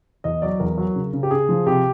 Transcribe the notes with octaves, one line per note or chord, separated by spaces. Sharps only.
E2 D#5
F#3 D5
E2 A#4
F#3
C#3
C#3
G4
C#3 G#4
F3
C3 G4